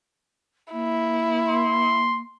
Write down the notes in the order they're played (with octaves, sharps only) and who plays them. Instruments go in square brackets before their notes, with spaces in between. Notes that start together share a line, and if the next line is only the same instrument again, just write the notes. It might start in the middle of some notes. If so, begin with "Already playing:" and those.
[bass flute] A#3 [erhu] E4
[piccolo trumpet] C6